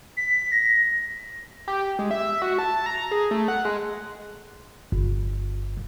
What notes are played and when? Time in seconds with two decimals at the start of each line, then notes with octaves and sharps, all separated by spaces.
0.17 B6
0.52 A#6
1.68 G4
1.99 G#3
2.11 E5
2.42 F#4
2.59 A5
2.86 A#5
3.11 G#4
3.31 A3
3.48 F#5
3.65 G#3
4.92 G1